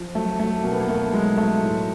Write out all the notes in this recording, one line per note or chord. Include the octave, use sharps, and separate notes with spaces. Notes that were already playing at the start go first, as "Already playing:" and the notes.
Already playing: F3
F#3 A3
F#3 A3
B2 A#3
B3
A#3
B2 A3
F#3 G#3
F#3 A3
A2